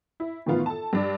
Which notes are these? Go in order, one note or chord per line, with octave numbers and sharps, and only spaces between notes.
E4
A2 D#3 E3 B3 F4
A4 A5
G2 D4 D5